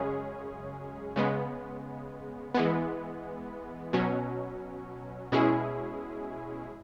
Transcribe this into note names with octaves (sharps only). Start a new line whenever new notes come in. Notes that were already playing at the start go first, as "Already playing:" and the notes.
Already playing: F#2 C#3 G#3 C#4 G#4
C#3 G#3 B3
E3 G#3 B3
B2 F#3 C#4
B2 G#3 C#4 E4 G#4